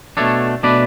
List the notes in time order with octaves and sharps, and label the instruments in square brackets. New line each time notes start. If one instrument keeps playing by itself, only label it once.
[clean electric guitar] B2 A3 D4 A4 C#5
B2 A3 D4 B4 D5